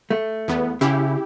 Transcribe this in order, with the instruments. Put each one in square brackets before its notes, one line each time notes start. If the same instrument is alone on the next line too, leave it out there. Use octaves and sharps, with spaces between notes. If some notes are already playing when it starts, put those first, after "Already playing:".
[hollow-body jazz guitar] A3
[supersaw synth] E2 B3
[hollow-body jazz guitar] C#3 [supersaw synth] E4 G4